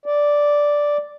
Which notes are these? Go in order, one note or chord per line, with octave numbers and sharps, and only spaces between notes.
D5